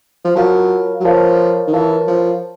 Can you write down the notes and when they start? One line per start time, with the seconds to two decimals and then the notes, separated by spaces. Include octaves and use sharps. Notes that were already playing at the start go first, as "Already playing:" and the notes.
0.25 F3
0.36 F#3 F4 A#4 C#5 F5 A5
1.00 F#3
1.04 F3 F4 A#4 C#5 F5 A5
1.67 D#3
1.73 E3 F4 A#4 C#5 F5 A5
2.07 F3